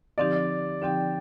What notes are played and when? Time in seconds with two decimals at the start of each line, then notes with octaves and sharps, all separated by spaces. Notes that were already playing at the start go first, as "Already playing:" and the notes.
0.18 D3 F3 C4 D#4 G4 D5
0.82 D3 F3 C4 D#4 G4 G5